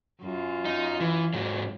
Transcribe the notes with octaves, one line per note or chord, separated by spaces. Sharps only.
F#2 F4
D#4
E3
G#2 F#3